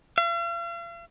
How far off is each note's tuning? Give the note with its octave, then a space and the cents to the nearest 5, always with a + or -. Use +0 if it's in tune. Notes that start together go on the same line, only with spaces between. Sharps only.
F5 -45